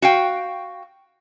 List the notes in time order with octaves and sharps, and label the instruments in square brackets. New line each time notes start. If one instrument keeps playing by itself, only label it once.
[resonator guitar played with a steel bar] F#4 F5 G5